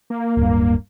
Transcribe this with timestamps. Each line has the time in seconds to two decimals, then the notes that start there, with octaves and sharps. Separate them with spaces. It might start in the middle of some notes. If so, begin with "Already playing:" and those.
0.10 A#3
0.37 D1 G2